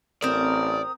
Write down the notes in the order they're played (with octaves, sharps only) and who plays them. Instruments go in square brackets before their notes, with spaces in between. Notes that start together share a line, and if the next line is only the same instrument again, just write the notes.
[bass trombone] A1 [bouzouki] C4 A#4 [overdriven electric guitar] D5 [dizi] D#6